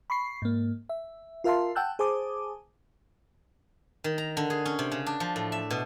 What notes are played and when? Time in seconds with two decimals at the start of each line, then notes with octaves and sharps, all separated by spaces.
0.10 B5 C#6 C7
0.42 G#2 A#3
0.89 E5
1.44 F4 A#4 E5 F5 A5 C6
1.75 F#5 G5 A5 E6 F#6 G6
1.99 G#4 C5 G#5 A5 D6 D#6
4.04 D#3
4.18 A#5
4.37 D3
4.50 G#4
4.66 C#4
4.79 C3
4.92 C#3
5.06 D4
5.20 F3
5.36 A2
5.52 E5
5.71 B2